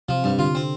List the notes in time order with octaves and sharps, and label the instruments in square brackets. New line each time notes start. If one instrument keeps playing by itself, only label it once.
[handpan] C3 [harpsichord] F3
[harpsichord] G2
[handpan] D3 [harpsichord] F4
[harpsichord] C4